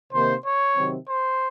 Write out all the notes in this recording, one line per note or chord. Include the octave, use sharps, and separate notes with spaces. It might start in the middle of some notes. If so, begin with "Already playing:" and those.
C3 D#3 A#3 C5
C#5
C3 D#3 F#3 C4
C5